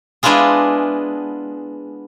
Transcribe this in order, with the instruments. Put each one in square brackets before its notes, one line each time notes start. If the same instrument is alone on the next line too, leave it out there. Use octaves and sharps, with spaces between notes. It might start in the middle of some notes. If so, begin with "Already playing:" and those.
[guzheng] G#3 B3 D4 E4 F4 G#4